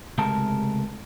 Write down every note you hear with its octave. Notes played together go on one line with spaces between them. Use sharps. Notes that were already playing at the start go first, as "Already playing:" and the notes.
C#2 C3 G#3 A3 A#4 A5